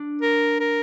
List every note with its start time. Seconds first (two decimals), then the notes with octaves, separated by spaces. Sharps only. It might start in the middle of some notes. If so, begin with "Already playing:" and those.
Already playing: D4
0.21 A#4
0.60 A#4